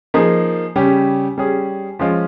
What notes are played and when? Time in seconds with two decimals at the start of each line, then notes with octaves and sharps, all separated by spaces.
0.14 F3 A#3 D#4 G#4
0.76 C#3 G3 C#4 G4
1.38 G3 C#4 G#4
1.99 F3 G#3 C#4 F4